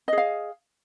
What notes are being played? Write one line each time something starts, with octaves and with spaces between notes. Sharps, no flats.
G#4 D#5 F5